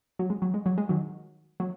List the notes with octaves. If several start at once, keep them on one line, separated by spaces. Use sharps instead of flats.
F#3
G#3
F#3
G#3
F#3
G#3
D#3 F#3
F#3